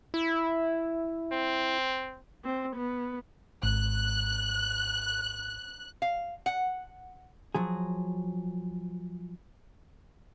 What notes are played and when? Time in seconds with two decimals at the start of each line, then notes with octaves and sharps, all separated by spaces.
0.14 E4
1.33 C4
2.44 C4
2.76 B3
3.63 G#1 F#6
6.02 F5
6.46 F#5
7.55 F3 F#3 G#4